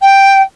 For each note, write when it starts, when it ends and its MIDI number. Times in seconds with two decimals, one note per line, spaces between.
0.01 0.41 79